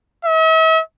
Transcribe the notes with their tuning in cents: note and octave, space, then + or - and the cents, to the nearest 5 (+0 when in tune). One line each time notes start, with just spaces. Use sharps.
E5 -45